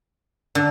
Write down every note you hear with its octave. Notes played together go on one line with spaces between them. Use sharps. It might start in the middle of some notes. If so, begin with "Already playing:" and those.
D3